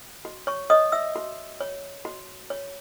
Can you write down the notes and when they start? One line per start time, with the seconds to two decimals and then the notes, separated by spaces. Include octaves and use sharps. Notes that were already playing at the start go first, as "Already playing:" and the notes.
0.25 F#4
0.47 C#5 C#6
0.70 C#5 D#5 D#6
0.92 E5 E6
1.16 F#4
1.61 C#5
2.05 F#4
2.50 C#5